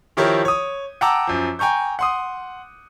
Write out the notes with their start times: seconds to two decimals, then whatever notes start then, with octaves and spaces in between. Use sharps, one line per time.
0.17 D#3 F3 E4 G4 A#4 C#5
0.45 C#5 D#6
1.01 F#5 G5 A5 A#5 D6 E6
1.27 F#2 F3
1.59 G5 G#5 A#5 C#6 G6
1.99 F#5 C6 D#6